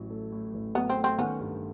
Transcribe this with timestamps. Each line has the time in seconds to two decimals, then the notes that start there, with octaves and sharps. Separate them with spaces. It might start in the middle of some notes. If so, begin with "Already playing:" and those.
Already playing: A1 A2 F#3
0.10 A3
0.32 A2
0.54 A1
0.75 F#3 B3
0.90 C4
0.97 A3
1.04 C4
1.18 D#3 B3 C#4
1.40 G2